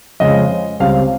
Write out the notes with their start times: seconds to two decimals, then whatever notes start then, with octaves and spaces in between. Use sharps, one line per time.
0.20 F2 C#3 G#3 C#4 D#5
0.80 C#2 C#3 G3 C4 F5